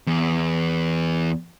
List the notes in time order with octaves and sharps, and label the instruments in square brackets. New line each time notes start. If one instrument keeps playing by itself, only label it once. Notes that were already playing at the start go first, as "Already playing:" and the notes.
[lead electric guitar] E2